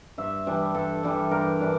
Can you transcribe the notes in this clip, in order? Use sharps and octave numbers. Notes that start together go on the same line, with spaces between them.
G2 E5
E3 G3 D4
G2 A4
E3 G3 D4
G2 A#4
E3 G3 D4